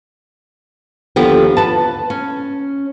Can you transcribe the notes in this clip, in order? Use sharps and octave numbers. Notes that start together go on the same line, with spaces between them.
D#2 D3 F3 B3 G4
B4 A5
C#4